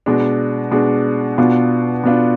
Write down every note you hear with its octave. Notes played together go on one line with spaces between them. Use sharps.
B2 G#3 D4
B2 G#3 D4
B2 B3 D4 F4
B2 B3 D4 F4